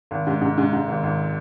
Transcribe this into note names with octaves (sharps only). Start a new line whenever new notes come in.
G#1
G#2
G#2
G#2
G#2
G#1
G#1